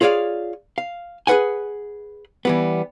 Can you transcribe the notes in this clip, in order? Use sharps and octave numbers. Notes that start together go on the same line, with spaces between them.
F4 G#4 C#5 D5 F5
F5
G#4 A4 B4 F#5 G#5
E3 G3 B3